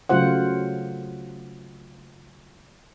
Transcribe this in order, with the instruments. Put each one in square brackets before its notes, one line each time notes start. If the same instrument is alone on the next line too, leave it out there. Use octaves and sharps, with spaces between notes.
[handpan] C#3 F#3 A3 F4 C5 F#5